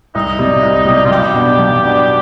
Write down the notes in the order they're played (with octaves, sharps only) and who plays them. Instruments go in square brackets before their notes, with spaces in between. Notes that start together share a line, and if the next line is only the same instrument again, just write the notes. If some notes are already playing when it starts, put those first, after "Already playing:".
[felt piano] C2 [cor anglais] D#4
[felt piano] C3 G3
C2
C3 G3
[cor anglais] F4
[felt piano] B1 [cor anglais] G4
[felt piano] B2 B3 D4
B1
B2 B3 D4